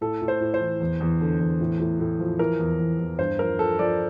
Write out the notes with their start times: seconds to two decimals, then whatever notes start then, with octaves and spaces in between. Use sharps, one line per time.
0.01 A2 A4
0.22 A2
0.28 C5
0.41 A2
0.54 C5
0.61 E3
0.80 E2
1.00 E2
1.21 D3
1.40 E2
1.61 A2
1.80 A2
2.00 A2
2.20 F3
2.39 E3 A#4
2.59 E2
2.79 E2
2.99 E2
3.18 G2 C5
3.39 F3 A#4
3.59 F3 A4
3.79 F3 D5